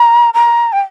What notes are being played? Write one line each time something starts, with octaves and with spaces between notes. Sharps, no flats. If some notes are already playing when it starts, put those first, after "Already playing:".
Already playing: A#5
A#5
G5